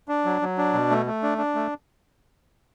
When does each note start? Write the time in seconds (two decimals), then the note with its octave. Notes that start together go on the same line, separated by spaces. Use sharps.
0.09 D4
0.25 F#3
0.41 F#3
0.58 D4
0.73 B2
0.90 A3
1.06 A3
1.23 D4
1.38 D4
1.55 A3